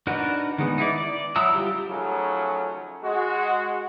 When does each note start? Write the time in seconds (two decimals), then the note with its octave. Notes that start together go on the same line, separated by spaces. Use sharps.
0.07 D4 D#4 F#4 A#4 B4
0.58 D#3 G#3 B3
0.78 D#4 E4 D5
0.98 D5
1.36 F#3 E4 A#5 D#6 E6
1.54 G3 F4 G4
1.87 C#3 F3 F#3 A3 C#4 D#4
3.03 G#3 F#4